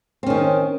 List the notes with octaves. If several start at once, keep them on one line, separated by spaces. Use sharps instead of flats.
D#3 C4 C#4